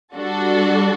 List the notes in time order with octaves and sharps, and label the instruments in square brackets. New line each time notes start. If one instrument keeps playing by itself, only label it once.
[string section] G3 D4 F#4 A4